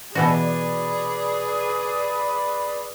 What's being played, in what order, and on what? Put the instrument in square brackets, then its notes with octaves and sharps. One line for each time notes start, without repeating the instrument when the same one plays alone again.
[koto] B2 E3 F#4 [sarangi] G#4 [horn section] B4 D5